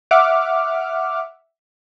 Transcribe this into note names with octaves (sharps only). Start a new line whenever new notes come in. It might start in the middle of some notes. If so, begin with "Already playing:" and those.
E5 F#5 D6 F6